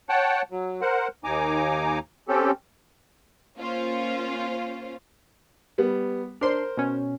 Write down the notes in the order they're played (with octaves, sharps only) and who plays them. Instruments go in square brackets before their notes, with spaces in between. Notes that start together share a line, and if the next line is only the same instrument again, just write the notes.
[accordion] C#5 F#5 G5 A5
F#3
A#4 C5 F#5
D#2 D#4 G#5 A#5 D6
C4 C#4 G4 A4
[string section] A#3 C#4 F4 C5
[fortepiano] G3 B3
[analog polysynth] D4 C6 [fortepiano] A#4 C5
[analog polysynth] B2 C#4